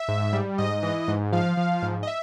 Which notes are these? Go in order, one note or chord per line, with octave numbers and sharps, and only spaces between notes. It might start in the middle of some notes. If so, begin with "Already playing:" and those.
Already playing: E5
G#2
G3
G#2 D#5
E3
G#2
F3 F5
F3
G#2
D#5
E5